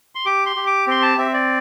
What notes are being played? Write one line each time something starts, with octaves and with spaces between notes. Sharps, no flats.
C6
G4 D6
C6
G4
D6
C4 C6
A5
C4 E5
D5